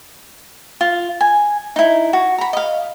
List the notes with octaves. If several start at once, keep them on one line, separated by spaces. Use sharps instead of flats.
F4
G#5
D#4 E4
F#4
A#5 B5
D#5 F5